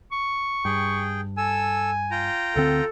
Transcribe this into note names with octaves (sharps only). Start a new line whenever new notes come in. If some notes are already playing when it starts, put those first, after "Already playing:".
C#6
G2 G#4 G5
A4 G#5 E6
F4 G5 A#5
D2 D3 C4 A4